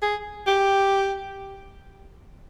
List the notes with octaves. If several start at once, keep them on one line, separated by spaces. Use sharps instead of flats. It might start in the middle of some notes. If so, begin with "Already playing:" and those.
G#4
G4